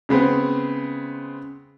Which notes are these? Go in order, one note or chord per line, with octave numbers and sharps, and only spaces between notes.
C#3 G#3 B3 C4